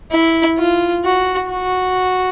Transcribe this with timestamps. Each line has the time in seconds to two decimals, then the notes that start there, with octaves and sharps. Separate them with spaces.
0.12 E4
0.58 F4
1.04 F#4
1.50 F#4